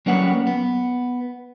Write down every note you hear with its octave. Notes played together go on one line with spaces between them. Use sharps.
F#3 G3 A#3 C#4 B4 F#5
B3